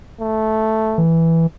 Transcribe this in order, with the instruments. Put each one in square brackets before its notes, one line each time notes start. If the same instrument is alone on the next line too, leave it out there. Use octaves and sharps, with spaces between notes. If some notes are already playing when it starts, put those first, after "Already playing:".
[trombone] A3
[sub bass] E3